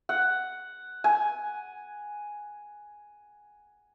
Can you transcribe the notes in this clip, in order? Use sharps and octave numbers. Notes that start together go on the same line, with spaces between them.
F#5
G#5